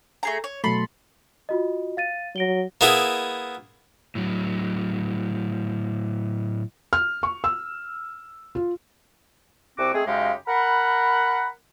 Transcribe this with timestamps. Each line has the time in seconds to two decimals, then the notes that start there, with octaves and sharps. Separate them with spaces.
0.23 A3 G#4 A#5
0.44 C#5
0.64 B2 F#3 A3 A4 B5 C6
1.49 F4 F#4 D#5
1.97 F5 A6 D#7
2.36 F#3 A#6 D7 G7
2.81 A#3 B3 E4 G#4
4.15 A2 F#3
6.93 F6
7.23 C#6
7.44 E6
8.55 F4
9.78 C2 C3 C4 F#4 D6
9.94 G#3 A3 C4 G#4
10.07 F#2 C#3 G#3 D#4 G4 F5
10.47 A#4 F#5 B5